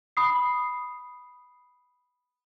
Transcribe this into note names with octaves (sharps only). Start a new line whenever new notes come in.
B5 D#6 C7